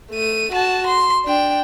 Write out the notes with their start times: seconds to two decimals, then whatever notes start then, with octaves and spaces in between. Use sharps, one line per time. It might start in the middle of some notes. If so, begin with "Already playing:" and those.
0.11 A3 D#7
0.52 F#4 A5
0.87 C6
1.26 D4 G5